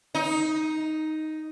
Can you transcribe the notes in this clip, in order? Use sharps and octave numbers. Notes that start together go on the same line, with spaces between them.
D#4